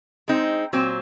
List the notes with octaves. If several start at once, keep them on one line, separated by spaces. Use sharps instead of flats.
G#3 C4 D#4
A#2 F#3 C4